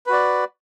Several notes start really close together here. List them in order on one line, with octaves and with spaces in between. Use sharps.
B4 F#4 D5